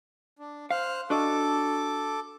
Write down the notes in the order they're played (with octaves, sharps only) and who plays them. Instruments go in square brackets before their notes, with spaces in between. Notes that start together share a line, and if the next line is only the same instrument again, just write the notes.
[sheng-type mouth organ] D4
[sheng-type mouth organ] C5 F6 F#6 [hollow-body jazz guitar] F5
[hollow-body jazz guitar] D4 F#4 D#5 [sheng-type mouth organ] A4 D6